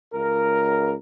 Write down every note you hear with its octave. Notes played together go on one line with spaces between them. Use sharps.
C#2 A#4